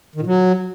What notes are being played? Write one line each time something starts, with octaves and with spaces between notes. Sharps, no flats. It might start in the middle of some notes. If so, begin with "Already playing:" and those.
D#3
A#2
F#3